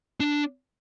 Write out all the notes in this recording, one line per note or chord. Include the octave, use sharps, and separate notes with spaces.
D4